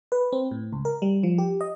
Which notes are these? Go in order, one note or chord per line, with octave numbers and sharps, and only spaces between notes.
B4
C4
A2
C#2
A#4
G3
F3
G4
D#5